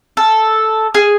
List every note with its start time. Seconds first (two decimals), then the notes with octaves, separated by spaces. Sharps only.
0.17 A4
0.94 G#4